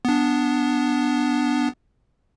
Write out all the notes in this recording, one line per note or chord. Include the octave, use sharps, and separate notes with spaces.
B3 D4